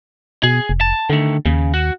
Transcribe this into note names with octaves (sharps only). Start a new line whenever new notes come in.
B2 G#4
F1
A5
D3 D#3 A3
D#2 C#3
F#4